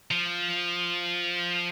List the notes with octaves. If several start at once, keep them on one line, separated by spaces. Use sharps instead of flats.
F3